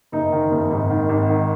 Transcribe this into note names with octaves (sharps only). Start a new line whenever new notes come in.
F#1 D#4
D#3
F#1
G#1
D#3
G#1
D#3